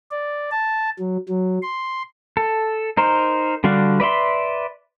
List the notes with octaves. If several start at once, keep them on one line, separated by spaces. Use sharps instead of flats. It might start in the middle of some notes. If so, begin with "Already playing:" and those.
D5
A5
F#3
F#3
C6
A4
D#4 A#4 C5
D3 G3 D4 F#4 F5
B4 D5 E5 C6